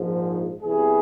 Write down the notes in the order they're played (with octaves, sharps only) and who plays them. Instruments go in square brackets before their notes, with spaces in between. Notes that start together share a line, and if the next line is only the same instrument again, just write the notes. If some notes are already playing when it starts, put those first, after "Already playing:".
Already playing: [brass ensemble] A#1 G#2 F3
E2 C3 E3 G3 G#4